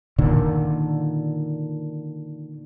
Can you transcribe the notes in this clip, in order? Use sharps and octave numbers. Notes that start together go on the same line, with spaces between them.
A#2 D3 D#3